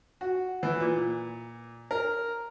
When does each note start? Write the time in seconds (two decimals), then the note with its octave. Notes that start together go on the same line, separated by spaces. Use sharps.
0.21 F#4
0.63 E3
0.80 A#2
1.91 A#4